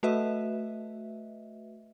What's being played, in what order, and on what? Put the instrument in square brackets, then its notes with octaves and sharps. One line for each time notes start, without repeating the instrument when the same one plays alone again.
[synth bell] A3 F#4 B4 D#5 E5